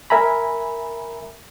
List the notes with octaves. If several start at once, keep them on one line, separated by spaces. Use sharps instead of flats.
A#4 E5 G#5 A#5 B5